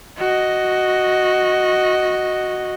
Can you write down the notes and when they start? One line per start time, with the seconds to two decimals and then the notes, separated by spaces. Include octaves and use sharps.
0.18 F#4 D#5